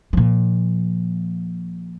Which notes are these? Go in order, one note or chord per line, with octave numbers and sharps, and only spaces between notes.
A#2 F3